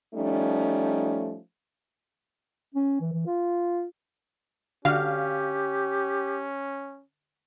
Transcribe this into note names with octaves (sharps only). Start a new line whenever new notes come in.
F3 G3 A3 C#4 D#4
C#4
E3
E3
F4
D3 C#4 D4 F#4 G4 F5